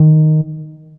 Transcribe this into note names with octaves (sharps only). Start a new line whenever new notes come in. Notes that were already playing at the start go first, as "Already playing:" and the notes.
Already playing: D#3